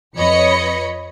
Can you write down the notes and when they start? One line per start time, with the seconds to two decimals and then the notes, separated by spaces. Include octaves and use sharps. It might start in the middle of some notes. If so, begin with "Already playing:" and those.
0.15 F2 B4 C#5 D#5 B5 C#7